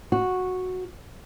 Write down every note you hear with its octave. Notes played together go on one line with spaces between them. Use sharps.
F#4